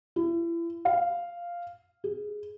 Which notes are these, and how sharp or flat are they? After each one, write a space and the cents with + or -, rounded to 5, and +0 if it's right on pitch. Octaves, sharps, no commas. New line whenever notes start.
E4 +35
F5 -5
G#4 +10